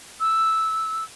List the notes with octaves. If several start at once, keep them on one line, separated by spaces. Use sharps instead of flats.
E6